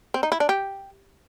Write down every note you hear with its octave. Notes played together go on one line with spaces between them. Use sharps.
C4
D#4
E4
D4
G4